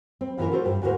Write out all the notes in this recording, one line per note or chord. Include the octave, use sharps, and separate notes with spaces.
C4
F#2 A#2 E3 E4 F4 A#4
F4 F#4 A4 A#4 C5
G2
D2 G#2 F#4 A4 A#4 C5